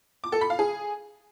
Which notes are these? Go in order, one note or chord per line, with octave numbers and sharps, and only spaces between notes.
D6
A4
B5
F5
G#4